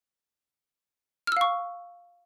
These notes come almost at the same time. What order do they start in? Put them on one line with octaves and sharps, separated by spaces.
F6 E6 F5 C#6